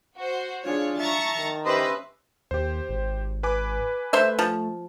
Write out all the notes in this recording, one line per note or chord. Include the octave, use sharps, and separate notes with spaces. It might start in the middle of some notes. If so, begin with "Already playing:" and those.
F#4 C5
D4 F4 G#4 C#5
E5 A5 A#5 C#6 A6
D#3
C#4 G4 B4 C5 D#5 E5
D#2 G4 C5
G#1
B4 G#5 D6
A3 C5 E5
F3